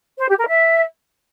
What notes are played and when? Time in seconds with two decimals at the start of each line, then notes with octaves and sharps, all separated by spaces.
0.18 C5
0.28 G4
0.38 A#4
0.48 E5